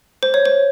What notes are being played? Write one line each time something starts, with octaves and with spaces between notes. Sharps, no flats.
C5
C#5
C5